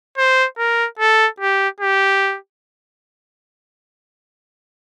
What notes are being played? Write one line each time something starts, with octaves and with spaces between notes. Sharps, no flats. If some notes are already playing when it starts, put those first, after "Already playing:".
C5
A#4
A4
G4
G4